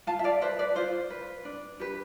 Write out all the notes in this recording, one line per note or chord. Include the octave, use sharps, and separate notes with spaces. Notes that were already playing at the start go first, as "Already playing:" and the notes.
F4 F5 A5
E5
D5 F5
B4 C5 E5
B4 D5
F4 C5
B4
D4
G4 B4